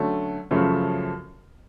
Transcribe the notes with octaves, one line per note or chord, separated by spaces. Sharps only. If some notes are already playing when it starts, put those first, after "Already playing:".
Already playing: D3 F#3 A3 C#4
F#2 C#3 F3 A3 C#4